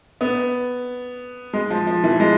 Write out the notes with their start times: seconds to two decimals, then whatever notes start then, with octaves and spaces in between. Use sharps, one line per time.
0.21 B3
1.53 G#3
1.70 F3
1.87 F3
2.04 E3
2.20 G#3